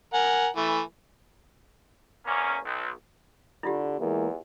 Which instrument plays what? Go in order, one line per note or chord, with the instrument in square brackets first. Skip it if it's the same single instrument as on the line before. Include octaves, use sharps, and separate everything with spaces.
[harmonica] A#4 F#5 G#5
E3 A3
[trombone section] E2 A#3 C#4
B1
[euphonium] D3 [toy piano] E4 F4 G4
[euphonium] E2 [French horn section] E3 G#3 A#3